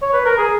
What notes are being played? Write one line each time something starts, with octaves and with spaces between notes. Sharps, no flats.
C#5
B4
A#4
G#4